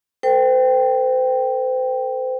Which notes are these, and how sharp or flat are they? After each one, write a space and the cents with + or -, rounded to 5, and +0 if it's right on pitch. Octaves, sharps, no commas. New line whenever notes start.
A4 +40 C5 -40 G5 +0